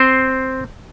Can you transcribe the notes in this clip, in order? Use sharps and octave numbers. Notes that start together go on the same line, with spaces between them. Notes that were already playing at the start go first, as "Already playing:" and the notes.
Already playing: C4 C5